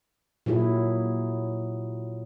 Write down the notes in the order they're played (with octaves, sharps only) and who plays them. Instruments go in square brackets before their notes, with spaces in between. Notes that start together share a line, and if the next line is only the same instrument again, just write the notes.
[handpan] A#2 F#3 E4 G#4